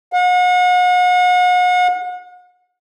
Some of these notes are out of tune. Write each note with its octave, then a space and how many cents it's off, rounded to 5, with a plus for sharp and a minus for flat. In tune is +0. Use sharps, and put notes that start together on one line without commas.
F#5 -40